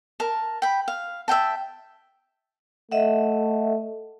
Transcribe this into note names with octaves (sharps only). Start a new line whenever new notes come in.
A#4 A5
G5 B5
F5
E5 F5 G5 A5
A3 D#5 E5 F#5